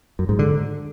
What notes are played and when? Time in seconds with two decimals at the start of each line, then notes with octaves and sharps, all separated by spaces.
0.19 F#2
0.29 G#2
0.39 D3